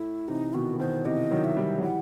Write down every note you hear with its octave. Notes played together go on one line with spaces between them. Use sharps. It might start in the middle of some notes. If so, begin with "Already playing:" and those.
Already playing: A2 E4
C3 E3 D#4
B2 D#3 F#4
E3
B2 D#3 C5
C3 E3 D#5
D#3 F#3
E5
E3 G3
F#3
E3 G3 F#5